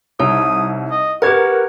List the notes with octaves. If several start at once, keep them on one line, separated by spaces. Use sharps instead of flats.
C2 D#4 C#5 D#6
D#5
F#4 G4 A#4 B4 F#5 G#6